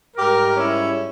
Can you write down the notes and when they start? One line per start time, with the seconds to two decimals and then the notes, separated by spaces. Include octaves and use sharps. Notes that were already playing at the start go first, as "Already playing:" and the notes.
0.17 G#2 G3 G4 A#4
0.55 C#4 E4